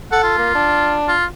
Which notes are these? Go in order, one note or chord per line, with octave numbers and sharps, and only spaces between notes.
A4 F#5
F4
A#3
D4
F4